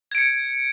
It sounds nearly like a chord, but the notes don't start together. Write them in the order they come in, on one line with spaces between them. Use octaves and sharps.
G#6 D7 C#7